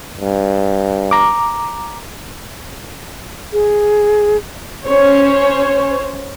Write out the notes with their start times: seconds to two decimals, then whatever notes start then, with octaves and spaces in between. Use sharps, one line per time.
0.21 G2
1.11 A#5 D6
3.53 G#4
4.86 C#4 C5 C#5